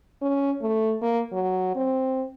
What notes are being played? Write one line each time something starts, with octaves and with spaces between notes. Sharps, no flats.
C#4
A3
A#3
F#3
C4